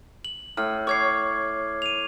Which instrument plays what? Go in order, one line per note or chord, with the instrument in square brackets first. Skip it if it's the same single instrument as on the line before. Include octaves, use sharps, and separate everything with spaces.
[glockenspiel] F#7
[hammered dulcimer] A2 [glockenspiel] F6
[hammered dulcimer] C#5 [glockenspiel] D6 G#6 C7
[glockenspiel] D#7 F7